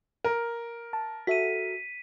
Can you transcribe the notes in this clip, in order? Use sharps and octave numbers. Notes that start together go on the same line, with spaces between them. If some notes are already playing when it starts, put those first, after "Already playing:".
A#4
A5
F#4 A4 E5 B6 D#7